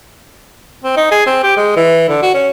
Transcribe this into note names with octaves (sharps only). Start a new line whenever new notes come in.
C4
D#4
G#4
C4
G4
G#3
E3
D3
F#4
C#4